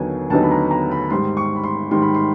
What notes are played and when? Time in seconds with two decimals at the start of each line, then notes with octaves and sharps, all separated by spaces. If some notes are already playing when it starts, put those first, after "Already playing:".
Already playing: D#2 D3 F#3 B3 D#4 G#5
0.30 D#2 D3 F#3 B3 D#4 A5
0.43 B5
0.51 A#5
0.71 A#5
0.91 B5
1.10 G#2 D#3 G3 C6
1.37 C#6
1.56 B5
1.64 C6
1.90 G#2 D#3 G3 C6
2.02 B5
2.14 C6